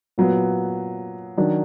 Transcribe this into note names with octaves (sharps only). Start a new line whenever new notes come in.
A#2 F#3 B3
D#3 F#3 D4